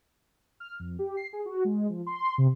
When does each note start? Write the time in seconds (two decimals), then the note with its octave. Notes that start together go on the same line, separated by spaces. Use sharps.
0.60 F6
0.79 F2
0.99 G4
1.17 C7
1.33 G#4
1.45 F#4
1.65 G#3
1.90 F3
2.07 C6
2.38 C3